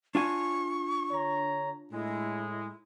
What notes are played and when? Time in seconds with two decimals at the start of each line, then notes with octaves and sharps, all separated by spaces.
0.15 D4 F4 G#5 C#6
1.11 D3 C#5 A#5
1.92 A2 G#3 E4